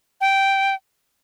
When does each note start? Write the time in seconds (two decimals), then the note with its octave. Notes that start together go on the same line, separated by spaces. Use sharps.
0.21 G5